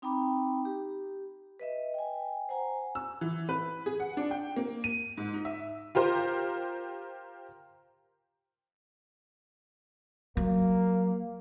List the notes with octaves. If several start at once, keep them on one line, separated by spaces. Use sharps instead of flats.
C4 D#4 G5 A#5 B5 D6
G4
B4 D#5 E5
G5 G#5
C5 F#5 G#5 A#5
E6
E3
B4
G#4
F#5
D4
G5
A#3
D#7
G#2
D#4
E5
F4 G4 A#4 C5
F#3 A#3